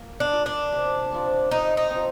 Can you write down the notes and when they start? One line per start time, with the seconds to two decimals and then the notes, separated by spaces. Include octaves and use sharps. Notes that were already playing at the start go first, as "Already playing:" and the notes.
Already playing: A#3 F4
0.20 D4
0.33 F4 A#4 D5
0.46 D4
0.72 C3
1.12 F3 C4
1.51 C3 D#4
1.77 D#4
1.90 C4
1.95 F3